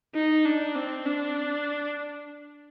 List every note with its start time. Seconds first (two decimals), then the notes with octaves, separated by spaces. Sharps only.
0.15 D#4
0.45 D4
0.76 C4
1.06 D4